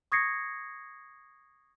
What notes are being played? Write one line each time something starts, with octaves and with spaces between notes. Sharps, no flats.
C#6 D#6 G#6 A#6 C7 C#7